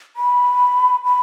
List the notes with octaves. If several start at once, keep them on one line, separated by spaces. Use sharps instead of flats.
B5
B5